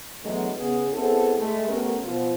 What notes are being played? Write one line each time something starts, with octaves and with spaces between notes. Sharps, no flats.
D3 E3 F#3 G#3 A3 B3
C#3 B3 G#4
B3 C4 E4 G#4 A4
G#3 A3
A3 B3 C#4 G4 A#4
B2 F3 F4